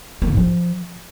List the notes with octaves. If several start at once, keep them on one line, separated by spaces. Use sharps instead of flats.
A#3
D3
G#2
F3